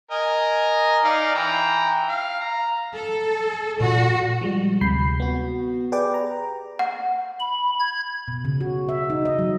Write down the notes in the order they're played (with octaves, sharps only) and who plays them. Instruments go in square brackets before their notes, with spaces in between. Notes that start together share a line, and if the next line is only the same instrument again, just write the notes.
[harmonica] A#4 D#5 G#5
D#4 D5 F5
E3 G5 A#5
F5
A#5
[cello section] A4
[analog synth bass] A#2 [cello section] F#4
[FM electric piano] F3 G3 G#3
D2 C3 B5 G6 C7
B3 F#4
G4 G#4 B4 D5 G5 D6
A#5
[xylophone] F#5
[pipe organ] B5
G#6
[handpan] B2
C#3
F#4
E5
D#4
D#5
F#3